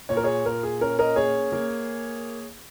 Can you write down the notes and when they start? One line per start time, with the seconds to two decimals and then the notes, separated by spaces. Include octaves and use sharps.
0.09 A#2 C#5
0.17 A#4
0.23 G#4 C#5
0.45 A#2 A#4
0.63 G#4
0.81 C#4 A#4
0.99 A#4 D#5
1.16 A#3 G#4 C#5
1.52 A#3